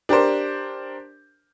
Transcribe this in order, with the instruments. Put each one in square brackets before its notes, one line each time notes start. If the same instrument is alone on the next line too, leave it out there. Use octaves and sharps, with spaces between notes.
[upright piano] D4 G4 A#4 C5